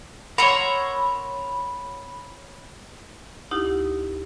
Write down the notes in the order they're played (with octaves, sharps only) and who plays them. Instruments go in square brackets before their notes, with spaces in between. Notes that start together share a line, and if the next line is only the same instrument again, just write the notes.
[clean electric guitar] A#4 C#5 [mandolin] F#5 C6 E6 [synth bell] B5
[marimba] D2 D#4 E4 G4